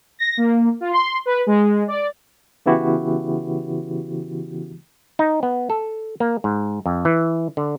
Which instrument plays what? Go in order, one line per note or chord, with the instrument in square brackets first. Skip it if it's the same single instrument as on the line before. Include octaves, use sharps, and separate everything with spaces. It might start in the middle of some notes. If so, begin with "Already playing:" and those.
[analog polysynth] A#6
A#3
F4
C6
B4
G#3
D5
[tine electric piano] C#3 E3 B3 E4 F#4 G4
[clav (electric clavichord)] D#4
B3
A4
A#3
G#2
F2
E3
D3